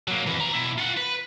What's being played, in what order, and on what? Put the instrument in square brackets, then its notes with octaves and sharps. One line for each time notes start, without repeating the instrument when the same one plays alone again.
[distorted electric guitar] F#3 A#3
F2 E3
B4 A#5
B2 E4
F4 F#5
B4